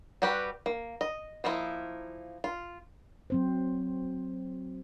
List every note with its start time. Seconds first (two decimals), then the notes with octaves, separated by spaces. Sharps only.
0.22 G3 F#4 G4 B4
0.66 A#3
1.01 D#5
1.44 F3 A#3 D#4 E4
2.44 F4
3.30 F#3 C4 C5